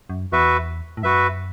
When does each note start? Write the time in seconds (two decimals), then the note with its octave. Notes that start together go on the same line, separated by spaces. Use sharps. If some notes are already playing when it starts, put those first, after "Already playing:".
0.10 F#2
0.32 E2 F#4 B4 E5
0.97 A2
1.03 F#2 F#4 B4 E5